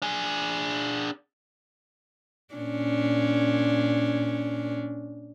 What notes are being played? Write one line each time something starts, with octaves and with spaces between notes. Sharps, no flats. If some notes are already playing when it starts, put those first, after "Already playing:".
D4 G#4
A#2 C#4 D4